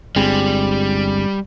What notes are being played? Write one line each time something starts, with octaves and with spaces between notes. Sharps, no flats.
G1 G3 G#3 C4